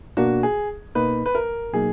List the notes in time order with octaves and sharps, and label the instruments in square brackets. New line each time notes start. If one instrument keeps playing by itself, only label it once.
[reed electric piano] B2 A#3 D4 [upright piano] F#4
[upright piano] G#4
[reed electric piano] B2 A#3 D#4 [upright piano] B4
[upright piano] B4
A#4
[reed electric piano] B2 F#3 A#3 D#4 [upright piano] G#4